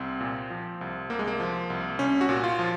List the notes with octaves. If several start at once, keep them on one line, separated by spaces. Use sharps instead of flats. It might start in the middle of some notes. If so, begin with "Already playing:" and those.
Already playing: C2 C4
A#2
F3
C2
C2 A#3
G#3
A#3
F3
C2
C2 C#4
F#4
A#2
F4
F3